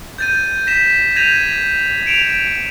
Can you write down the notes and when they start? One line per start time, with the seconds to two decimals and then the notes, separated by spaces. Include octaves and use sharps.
0.18 G6 A6 D#7
0.67 A#6 B6 E7
1.16 G6 G#6 A#6 D#7 F7
2.06 C#7 D7 E7 F7